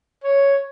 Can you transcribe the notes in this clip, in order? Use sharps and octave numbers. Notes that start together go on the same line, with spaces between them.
C#5